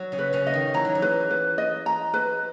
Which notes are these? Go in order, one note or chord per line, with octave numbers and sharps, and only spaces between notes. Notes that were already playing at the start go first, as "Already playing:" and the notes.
Already playing: F#3 F#4
C#3 C#4
B4
C#3 C#4
D#5
D#3
E3 A#5
F#3
E3
B4
B4
D#5
A#5
B4